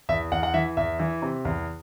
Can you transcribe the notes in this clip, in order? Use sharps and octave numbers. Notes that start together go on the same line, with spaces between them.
E2 E5
E2 F#5
F#5
E3 E5
E2 E5
E3
C3
E2